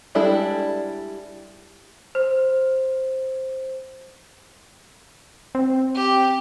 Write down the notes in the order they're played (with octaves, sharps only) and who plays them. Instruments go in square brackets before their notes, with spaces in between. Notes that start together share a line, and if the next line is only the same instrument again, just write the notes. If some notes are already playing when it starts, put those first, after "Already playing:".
[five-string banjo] G3 G#3 D4 E4 A4
[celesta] C5
[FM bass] C4
[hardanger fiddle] G4